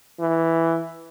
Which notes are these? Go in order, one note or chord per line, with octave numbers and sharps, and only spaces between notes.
E3